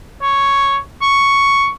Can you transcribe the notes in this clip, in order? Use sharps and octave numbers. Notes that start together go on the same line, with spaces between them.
C#5
C#6